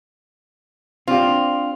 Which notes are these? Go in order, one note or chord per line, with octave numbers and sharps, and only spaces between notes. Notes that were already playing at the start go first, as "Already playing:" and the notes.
C4 D4 F4 G4